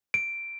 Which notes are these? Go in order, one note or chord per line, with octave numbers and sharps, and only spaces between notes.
D7